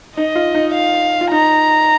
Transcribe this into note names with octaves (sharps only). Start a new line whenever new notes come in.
D#4 D#5
F4
D#4
F5
F4
D#4 A#5